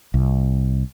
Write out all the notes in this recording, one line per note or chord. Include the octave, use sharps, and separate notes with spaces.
C2